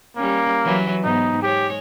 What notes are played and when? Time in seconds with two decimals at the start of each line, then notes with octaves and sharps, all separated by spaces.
0.17 G3 A#3 C#4
0.65 E3 F#3 B4
1.04 G#2 B3 D#4
1.42 G#3 G4 C#5